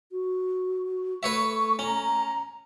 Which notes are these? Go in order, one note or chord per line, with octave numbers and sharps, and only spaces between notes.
F#4
A3 B4 C#5 E5 C#6
C#4 A#5